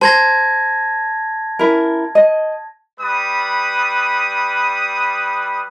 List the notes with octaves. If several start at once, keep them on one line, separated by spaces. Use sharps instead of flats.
C5 A5 G#6 A#6
C#4 E4 A#4
D#5
G3 B4 D#6